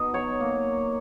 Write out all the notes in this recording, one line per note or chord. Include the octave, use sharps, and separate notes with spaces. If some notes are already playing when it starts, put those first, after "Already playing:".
Already playing: B2 D#4 D#5
F#3 C#5
A#3